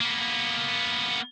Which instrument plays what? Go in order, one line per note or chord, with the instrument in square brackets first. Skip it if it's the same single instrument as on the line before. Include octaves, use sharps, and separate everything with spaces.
[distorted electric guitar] A#3 B3